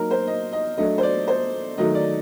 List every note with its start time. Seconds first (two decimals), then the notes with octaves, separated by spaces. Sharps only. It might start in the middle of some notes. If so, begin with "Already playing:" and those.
Already playing: F#3 A#3 D#4 A#4
0.11 C5
0.27 D#5
0.53 D#5
0.77 F#3 A3 D4 D#5
0.98 C5
1.03 D5
1.28 C5
1.78 D#3 F#3 A3 D#4 D#5
1.95 D5